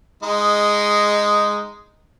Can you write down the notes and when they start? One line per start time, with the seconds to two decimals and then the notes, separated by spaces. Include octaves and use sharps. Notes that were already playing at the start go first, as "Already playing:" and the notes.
0.23 G#3 D#4